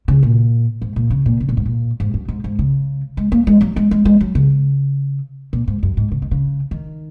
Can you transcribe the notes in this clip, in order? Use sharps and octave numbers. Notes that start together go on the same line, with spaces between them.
C#3
A#2
G#2
A#2
C#3
A#2
C#3
A#2
G#2
A#2
G#2
F#2
G#2
G#2
C#3
G#3
A#3
G#3
F#3
G#3
G#3
G#3
F#3
C#3
A#2
G#2
F#2
G#2
C#3
D#3
C#3
D#3